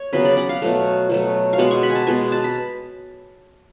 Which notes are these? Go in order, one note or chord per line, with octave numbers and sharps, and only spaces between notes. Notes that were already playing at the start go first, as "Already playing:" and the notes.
Already playing: C#5
C#3 F#3 B3 B4
D5
F#5
F5
B2 F#3 A3
B2 F#3 A3
F5
B2 G#3 B3 F#5
C#6
B5
G#5
A5
B2 G#3 B3 G#5
A5
B5